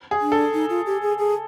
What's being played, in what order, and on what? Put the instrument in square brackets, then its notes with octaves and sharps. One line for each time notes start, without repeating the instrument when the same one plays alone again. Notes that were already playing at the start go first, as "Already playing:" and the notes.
[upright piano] G#4
[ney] D4
[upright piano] A4
[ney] D#4
F4
G4
G#4
G#4